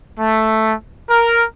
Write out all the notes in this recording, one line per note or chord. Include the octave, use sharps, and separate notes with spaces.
A3
A#4